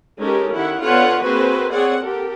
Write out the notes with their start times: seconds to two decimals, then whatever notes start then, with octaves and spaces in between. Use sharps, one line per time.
0.19 G#3 C#4 D#4 G4 A4 A#4
0.53 D#3 E4 G4 F#5
0.82 D3 B3 F4 B4 C#5 F#5
1.22 A#3 C4 F#4 G#4 B4 C5
1.72 C4 G#4 C#5 D5 F#5
2.02 G4 A4 A#4